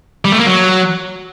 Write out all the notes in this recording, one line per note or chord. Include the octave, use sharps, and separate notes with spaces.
G3
A3
A#3
F#3